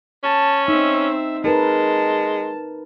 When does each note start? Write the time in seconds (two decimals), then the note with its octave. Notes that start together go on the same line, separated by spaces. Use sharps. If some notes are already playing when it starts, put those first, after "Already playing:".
0.24 C#4 A5
0.68 C4 D#4 E5
1.44 G#3 D#4 A#4 B4 A5